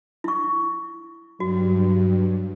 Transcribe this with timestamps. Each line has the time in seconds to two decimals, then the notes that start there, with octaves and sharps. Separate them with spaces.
0.24 E4 C#6
1.40 G2 F#3 F#4